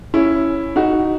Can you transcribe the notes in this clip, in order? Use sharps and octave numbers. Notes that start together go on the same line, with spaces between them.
C#4 E4
D#4 F#4